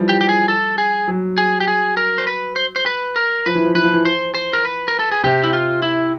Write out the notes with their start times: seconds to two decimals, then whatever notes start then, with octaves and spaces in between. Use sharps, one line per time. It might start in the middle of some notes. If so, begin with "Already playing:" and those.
Already playing: E3 F3 G3
0.09 G4
0.21 G4
0.29 G#4
0.48 A4
0.78 G#4
1.08 F#3
1.38 G#4
1.60 G4
1.68 G#4
1.97 A#4
2.18 C5
2.27 B4
2.56 C5
2.76 C5
2.86 B4
3.16 A#4
3.46 F3 B4
3.55 E3
3.65 F3
3.75 E3 B4
3.84 F3
3.94 E3
4.05 C5
4.34 C5
4.53 A#4
4.65 B4
4.88 A#4
4.99 A4
5.11 G#4
5.24 C3 G4
5.44 E4
5.53 F4
5.82 E4